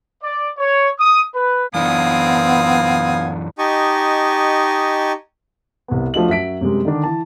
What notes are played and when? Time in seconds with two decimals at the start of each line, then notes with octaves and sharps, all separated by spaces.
0.23 D5
0.57 C#5
0.99 D#6
1.34 B4
1.74 F#2 E3 B3 C4 D4 F5 G#5 D#6
3.58 D#4 G4 D#5 G#5 A5 C#6
5.88 C2 B3
6.14 F3 A3 D4 F#4 D#5 F#7
6.28 F#2 F#3 E5 B6 D7
6.61 F#2 C3 G3 G#3
6.85 D3 D#3 D4
7.04 E3 A5